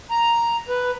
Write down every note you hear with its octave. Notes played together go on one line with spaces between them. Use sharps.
A#5
B4